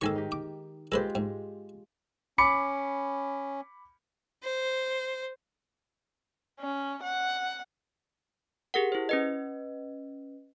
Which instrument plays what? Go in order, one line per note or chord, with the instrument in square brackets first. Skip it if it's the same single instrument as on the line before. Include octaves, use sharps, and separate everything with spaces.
[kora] G#2 D#3 G#4 [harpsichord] A4 G#5 C#6
[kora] D#4 G4
[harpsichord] D6
[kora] G#3 F4 G4 [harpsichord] A4 B4 C5
[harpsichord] G#2
[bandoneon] C#4 [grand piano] B5 D6 C#7
[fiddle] C5
[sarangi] C#4
F#5
[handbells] G4 G#4 A#4 F#5
E4 C5
C#4 B4 D#5